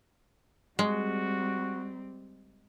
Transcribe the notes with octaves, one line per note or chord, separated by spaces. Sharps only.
G3 G#3 C4 F#4